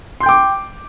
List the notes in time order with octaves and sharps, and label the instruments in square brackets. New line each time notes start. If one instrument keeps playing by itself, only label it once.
[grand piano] C6
G6
G5
D6